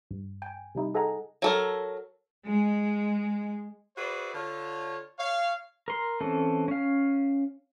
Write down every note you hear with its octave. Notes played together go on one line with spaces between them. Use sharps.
G2
G5 G#5
C3 G3 D#4 E4
G#4 A4 D#5 F#5 G#5 A#5
F#3 A4 A#4
G#3
E4 F#4 G#4 B4 C5 D5
D3 F4 C#5
C#5 F5
A#4 C6
E3 C4 C#4 A4
C#4 F5